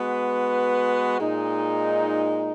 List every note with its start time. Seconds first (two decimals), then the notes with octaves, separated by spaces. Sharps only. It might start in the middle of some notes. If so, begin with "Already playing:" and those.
Already playing: G#3 B3 F#4 B4
1.19 A#2 G#3 D#4